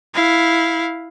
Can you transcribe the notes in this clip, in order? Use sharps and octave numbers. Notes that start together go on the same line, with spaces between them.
E4 F5